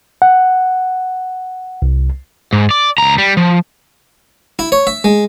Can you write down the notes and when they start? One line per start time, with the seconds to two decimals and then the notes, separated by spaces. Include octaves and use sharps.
0.22 F#5
1.82 C2
2.53 G#2
2.71 D5
2.98 C#2 A#5
3.18 G3
3.37 F3
4.59 E4
4.72 C#5
4.87 E5
5.04 G#3